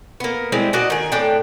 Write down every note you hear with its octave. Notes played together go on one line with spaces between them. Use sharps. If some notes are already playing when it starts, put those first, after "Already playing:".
A#3 B3
G3 G#3 C4 E4
A#2 F#4 D5 D#5
D#3 G#4
A2 D4 G5